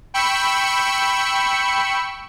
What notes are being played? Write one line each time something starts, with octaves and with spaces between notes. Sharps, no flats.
G5 B5 C#6 E6 C#7